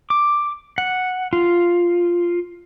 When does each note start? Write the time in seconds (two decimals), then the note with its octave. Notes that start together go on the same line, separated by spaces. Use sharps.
0.10 D6
0.78 F#5
1.33 F4